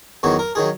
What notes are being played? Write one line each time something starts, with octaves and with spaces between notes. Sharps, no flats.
E2 D#3 F#3 F#4
A#4
D#3 F#3 G#4